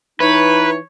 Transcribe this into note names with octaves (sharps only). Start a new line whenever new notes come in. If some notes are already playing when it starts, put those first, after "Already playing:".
E3 D#4 B4 C#5